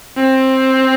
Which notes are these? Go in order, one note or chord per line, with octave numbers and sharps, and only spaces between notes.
C4